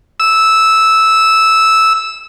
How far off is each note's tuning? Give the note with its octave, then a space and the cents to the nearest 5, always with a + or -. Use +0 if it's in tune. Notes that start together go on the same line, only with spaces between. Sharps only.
E6 -10